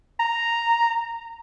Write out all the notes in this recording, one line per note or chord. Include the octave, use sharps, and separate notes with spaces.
A#5